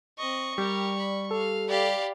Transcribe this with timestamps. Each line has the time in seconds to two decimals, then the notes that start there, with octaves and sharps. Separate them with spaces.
0.19 C4 D#5 C#6
0.58 G3 G4 A#4
0.98 B5
1.31 A4 F5
1.69 G4 D5 F5 B5